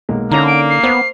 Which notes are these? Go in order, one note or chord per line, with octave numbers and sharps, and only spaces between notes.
B1 G#3 A#3
D3 A#3 C#4 D#4 A#5
D7
C7
B3 C5 F7